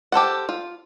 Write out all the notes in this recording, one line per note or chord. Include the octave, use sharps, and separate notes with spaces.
G4 A4 C5 F#5
F4